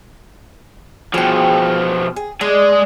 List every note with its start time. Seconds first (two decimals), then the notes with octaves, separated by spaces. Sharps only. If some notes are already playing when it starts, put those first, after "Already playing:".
1.14 B2 F3 G#4 G5
2.16 G#4
2.41 G#3 D4 G#4